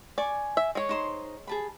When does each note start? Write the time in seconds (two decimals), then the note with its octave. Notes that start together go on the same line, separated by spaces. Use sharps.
0.18 D5 G#5 C#6
0.57 E5
0.75 G#3 C#5
0.89 D#4 C5 C6
1.47 G#4 A5 B5